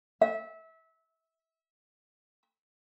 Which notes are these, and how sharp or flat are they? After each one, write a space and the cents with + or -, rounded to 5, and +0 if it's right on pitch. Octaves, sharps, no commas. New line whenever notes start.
E5 -25